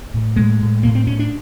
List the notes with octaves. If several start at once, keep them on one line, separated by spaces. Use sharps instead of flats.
A2
A2 G#3
A2
A2 A#3
C4
A2 C#4
D4